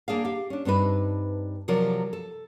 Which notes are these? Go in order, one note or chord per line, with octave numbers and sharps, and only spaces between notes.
A#3 D4 G#4 F5
G4 F5
C#4 D4
G2 C4 D4 D#4 B4
C3 F3 F#3 A#4 D5
A4